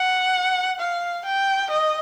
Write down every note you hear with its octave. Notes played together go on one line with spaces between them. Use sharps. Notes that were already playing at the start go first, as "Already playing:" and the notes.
Already playing: F#5
F5
G5
D#5